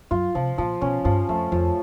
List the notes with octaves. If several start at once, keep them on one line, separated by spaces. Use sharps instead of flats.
F#2 F4
C3 F3
A#2 F3
B2 C#4
G2 F3
F2 A3
F2 F3